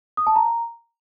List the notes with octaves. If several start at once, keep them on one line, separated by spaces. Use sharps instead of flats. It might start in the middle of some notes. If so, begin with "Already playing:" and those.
D#6
A5
A#5